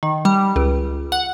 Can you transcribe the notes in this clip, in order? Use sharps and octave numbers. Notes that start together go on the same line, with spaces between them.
D#3
G3
C#2
F#5